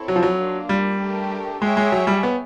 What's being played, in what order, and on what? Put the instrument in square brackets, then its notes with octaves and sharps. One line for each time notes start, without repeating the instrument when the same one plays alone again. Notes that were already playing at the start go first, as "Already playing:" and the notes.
Already playing: [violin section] C4 E4 A4 C#5
[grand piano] F#3
F3
F#3
[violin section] A#3 D4 F4
[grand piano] G3
[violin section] A3 D4 G4 A#4
[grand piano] G#3 [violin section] G#4 C#5 E5 G5
[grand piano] G#3
F#3
G3
B3